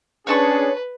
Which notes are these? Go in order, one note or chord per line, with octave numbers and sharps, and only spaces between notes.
C#4 D4 G#4 B4 C#5 A5 C#6